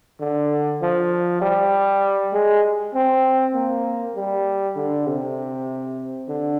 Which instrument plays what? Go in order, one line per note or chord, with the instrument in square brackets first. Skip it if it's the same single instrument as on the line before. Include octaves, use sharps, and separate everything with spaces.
[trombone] D3
F3
G3
G#3
C4
A#3
G3
D3
C3
D3